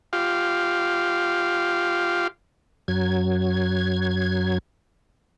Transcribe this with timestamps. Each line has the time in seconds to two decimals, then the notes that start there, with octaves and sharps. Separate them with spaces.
0.13 F4 G4 F5
2.88 F#2 F#3 G#6